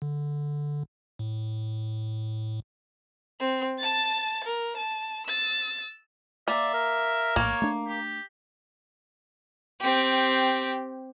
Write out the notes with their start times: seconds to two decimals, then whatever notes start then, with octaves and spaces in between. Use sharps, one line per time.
0.02 D3
1.19 A2
3.40 C4
3.78 A5 A6
4.44 A#4
4.77 A5
5.27 E6 A6
6.48 A#3 D5 E5
6.74 A#4
7.36 A#1 A2 A#3 C#5
7.62 A3 D4
7.87 G4
9.81 C4 G4